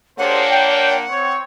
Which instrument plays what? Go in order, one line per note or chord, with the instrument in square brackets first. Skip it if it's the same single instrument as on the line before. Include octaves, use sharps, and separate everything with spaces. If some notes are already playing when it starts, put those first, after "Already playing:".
[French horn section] A#2 A#3 D4 [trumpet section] G4 G#4 C5 [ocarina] C#5 [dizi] F#5
[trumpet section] G5
C4 C#5